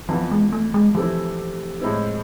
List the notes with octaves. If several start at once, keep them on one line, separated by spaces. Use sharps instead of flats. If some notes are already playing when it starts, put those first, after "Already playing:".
F2 E3 F3 B3 F4
G#3
A3
G#3
C3 E3 F3 A3 C4 E4
A2 G#3 C4 E4